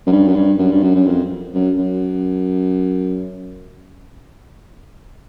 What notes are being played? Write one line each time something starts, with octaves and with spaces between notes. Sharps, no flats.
F#2
G2
F#2
G2
F#2
G2
F#2
F#2
F2
F#2
F#2